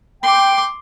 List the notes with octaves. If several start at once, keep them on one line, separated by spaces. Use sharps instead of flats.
G5 C6 D6